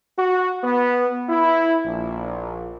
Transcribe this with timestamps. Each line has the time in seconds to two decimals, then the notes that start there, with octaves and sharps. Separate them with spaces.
0.19 F#4
0.64 B3
1.30 E4
1.86 A#1